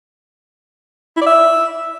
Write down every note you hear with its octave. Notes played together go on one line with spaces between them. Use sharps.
E4
D5
E5